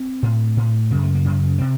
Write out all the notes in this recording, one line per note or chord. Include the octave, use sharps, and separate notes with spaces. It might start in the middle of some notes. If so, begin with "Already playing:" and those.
Already playing: C4
A2
A2
F#2 C#3 A#3
A3
A#3
F#2 C#3
C3 C4